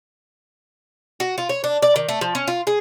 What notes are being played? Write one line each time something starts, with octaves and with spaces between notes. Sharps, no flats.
F#4
F4
C#5
D4
D5
D#3
A3
F3
C#4
F4
G#4